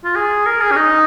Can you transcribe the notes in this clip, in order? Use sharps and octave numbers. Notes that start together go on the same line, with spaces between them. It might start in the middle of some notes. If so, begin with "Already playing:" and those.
F4
G#4
A#4
G#4
C#4
D#4